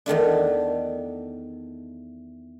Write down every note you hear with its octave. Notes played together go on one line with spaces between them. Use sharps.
E2 D#3 A3 D4